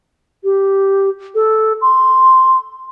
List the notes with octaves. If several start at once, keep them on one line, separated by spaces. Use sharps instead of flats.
G4
A4
C6